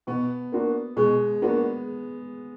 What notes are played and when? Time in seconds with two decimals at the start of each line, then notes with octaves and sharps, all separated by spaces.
0.07 B2 B3
0.52 A#3 D4 F#4
0.97 B2 G#3
1.42 A#3 B3 D4 F#4